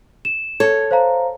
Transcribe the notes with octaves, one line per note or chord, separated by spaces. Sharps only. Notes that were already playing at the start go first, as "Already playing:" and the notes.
E7
A4 C#5 G#6
C5 F5 A#5